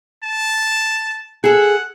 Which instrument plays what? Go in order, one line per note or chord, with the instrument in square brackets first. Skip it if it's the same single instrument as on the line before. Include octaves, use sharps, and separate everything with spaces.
[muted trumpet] A5
[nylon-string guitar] G#4 A4 [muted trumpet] F#5